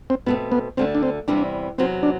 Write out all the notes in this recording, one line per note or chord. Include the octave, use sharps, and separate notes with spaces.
C4
B2 A3 B3 C4
B3
D2 D3 A3 C4
D4
C4
E2 C3 E3 G3 C4 D4
E2 C3 F#3 C4
D4